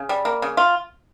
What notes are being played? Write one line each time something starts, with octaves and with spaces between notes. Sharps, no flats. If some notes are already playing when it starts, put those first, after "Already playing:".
Already playing: C#3
G3
A#3
C#3
F4